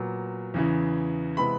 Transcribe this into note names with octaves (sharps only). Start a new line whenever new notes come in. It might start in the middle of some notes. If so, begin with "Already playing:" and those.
Already playing: A#2 F#3 B3
E2 C#3 E3
C3 E3 G#3 B3 B5